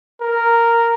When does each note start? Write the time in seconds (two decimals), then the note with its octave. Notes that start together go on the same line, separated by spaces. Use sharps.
0.21 A#4